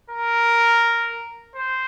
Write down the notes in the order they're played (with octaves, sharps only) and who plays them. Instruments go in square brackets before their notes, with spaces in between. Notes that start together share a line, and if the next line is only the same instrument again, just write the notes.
[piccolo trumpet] A#4
C5